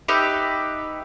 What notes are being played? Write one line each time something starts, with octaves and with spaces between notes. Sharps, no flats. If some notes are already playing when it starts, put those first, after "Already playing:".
D#4 G4 B4 E5